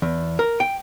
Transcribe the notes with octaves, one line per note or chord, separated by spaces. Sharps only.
E2
A#4
G5